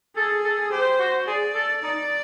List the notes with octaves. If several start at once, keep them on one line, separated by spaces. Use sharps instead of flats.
G#4 A4
A4
G4 C5
F#4
G#4 D5
A4
D#4 D5